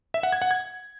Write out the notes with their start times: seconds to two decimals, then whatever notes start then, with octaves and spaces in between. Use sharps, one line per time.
0.14 E5
0.23 F#5
0.32 G#6
0.42 F#5
0.51 G#6